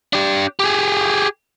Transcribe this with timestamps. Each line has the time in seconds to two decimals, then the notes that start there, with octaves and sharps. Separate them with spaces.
0.13 D4 G4
0.60 G4 G#4